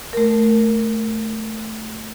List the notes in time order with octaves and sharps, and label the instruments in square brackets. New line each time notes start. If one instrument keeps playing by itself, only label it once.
[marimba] A3 A#4